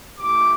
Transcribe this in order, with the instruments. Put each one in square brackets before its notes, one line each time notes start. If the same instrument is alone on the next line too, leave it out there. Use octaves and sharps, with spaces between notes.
[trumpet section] A3 E4 G4 D6